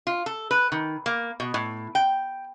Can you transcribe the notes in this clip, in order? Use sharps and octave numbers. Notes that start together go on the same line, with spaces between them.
F4
A4
B4
D#3
A#3
B2
A2
G5